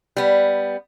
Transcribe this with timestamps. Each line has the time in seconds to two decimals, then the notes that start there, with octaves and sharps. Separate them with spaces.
0.17 G3 B3